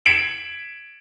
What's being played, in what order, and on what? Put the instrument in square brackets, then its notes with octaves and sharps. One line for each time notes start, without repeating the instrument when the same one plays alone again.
[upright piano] G#6 B6 D7 E7 F#7